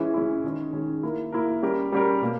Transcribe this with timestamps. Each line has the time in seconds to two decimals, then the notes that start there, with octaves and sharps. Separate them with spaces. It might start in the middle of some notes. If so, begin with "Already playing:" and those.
Already playing: E3 G#3 C#4 E4
0.14 E3 G#3 C#4 E4
0.44 D#3 G#3 C#4 G#4
0.73 D#3 G#3 C#4 G#4
1.03 A#3 E4 A#4
1.32 A#3 E4 A#4
1.62 G3 C#4 G4 A#4
1.92 G3 C#4 G4 A#4
2.22 B2 A#3